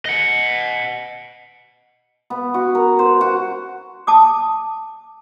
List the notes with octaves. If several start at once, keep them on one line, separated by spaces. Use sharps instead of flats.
D#5 F#5
B3
F#4
A#4
C5
F#4
A5 D6 D#6